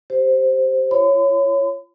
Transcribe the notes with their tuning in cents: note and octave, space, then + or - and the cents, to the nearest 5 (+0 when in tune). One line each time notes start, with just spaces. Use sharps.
G4 +0 C5 +0
E4 +45 C#5 +0 B5 +45